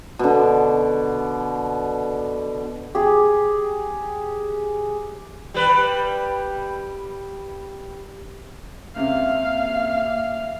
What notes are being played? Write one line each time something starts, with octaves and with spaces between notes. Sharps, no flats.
B2 D3
G4 G#4
G3 B4
C#2 C3 A#3 E5 F5